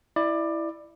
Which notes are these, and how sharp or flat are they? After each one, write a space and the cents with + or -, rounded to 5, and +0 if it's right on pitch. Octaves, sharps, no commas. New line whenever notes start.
E4 +0 D5 +20